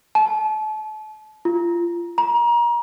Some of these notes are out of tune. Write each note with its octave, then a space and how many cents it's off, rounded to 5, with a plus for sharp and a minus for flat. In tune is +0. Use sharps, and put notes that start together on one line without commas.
A5 -35
F4 -25
A#5 +30